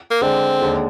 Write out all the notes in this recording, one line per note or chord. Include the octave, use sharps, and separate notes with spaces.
A#3
D3 G#3 C4 D4
D#2 D3 G#3